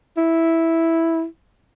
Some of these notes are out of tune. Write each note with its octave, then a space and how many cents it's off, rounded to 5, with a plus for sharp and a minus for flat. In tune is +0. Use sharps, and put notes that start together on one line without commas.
E4 -5